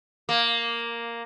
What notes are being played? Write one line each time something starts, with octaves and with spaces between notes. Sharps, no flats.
A#3